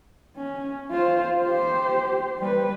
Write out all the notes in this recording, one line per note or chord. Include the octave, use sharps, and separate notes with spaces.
C#4
F4 C5
G4 C5
G3 B4